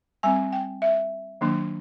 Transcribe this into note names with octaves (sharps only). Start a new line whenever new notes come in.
G3 C4 G#5
G5
E5
D#3 F#3 A#3 D4